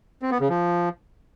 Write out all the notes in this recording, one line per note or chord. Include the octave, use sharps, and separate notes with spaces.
C4
B3
C#3
F3